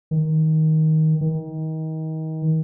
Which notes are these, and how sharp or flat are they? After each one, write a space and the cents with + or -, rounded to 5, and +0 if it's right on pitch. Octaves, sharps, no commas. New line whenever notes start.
D#3 +15
D#3 +30